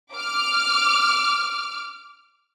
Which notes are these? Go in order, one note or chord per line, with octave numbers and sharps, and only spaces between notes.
D6 F6